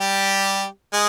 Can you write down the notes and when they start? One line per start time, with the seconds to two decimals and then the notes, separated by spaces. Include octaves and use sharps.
0.01 G3 G4
0.93 G#3 G#4